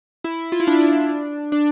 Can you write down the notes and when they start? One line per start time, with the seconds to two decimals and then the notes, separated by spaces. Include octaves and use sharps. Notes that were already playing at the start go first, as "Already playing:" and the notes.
0.24 E4
0.52 F4
0.60 E4
0.67 D4
1.52 D4